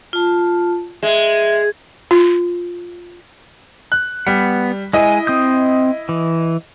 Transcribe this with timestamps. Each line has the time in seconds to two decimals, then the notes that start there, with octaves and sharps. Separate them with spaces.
0.13 F4 A5
1.03 G#3 E5
2.11 F4
3.92 F#6
4.27 G3 B3 F#5
4.93 G#3 E4 D#5 G#5
5.27 C4 D#6 G6
6.09 E3